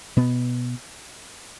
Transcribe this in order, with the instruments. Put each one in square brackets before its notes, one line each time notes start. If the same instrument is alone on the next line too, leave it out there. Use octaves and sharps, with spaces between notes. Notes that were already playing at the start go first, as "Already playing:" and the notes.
[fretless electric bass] B2 B3